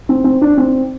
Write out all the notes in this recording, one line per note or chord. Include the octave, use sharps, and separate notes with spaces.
C4
C4
D4
C4